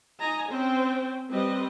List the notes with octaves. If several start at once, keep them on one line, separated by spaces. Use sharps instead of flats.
D#4 D#5 G#5 A#5
C4 C#4 C5 G5
G3 C4 B4 D#5